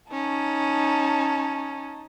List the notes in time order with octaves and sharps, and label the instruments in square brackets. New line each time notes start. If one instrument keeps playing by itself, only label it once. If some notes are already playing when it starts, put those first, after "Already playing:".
[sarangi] C#4 [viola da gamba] D#4 [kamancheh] A5